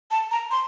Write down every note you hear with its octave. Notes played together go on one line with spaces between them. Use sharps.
A5
A#5
C6